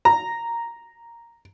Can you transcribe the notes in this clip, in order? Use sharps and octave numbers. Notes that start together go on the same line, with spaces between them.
A#5